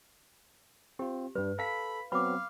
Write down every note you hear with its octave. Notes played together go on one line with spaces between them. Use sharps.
C4 F4 G4
G2 G3 B4
A4 F5 B5 B6
F#3 B3 C4 F5 B5 D6